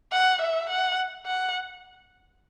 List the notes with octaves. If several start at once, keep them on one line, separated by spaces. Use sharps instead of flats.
F#5
E5
F#5
F#5